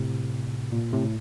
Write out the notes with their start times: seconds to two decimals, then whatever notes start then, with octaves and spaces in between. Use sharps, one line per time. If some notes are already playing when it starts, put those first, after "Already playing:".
Already playing: A2 C3
0.72 A#2
0.93 A2 C3